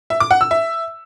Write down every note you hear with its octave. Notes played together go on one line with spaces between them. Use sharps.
E5
D6
F#5
E6
E5